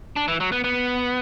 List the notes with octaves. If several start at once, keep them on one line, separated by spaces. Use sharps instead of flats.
D4
E3
F#3
B3
B3